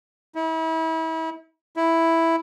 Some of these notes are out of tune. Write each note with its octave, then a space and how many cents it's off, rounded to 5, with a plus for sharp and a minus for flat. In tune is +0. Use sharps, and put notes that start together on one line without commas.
E4 -35
E4 +0